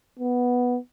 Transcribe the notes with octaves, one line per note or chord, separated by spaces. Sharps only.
B3